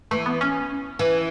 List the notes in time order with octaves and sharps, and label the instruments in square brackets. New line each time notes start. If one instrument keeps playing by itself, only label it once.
[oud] E3 [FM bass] A3
[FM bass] B3
C#4
[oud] E3